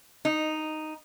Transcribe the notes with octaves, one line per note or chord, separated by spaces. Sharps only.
D#4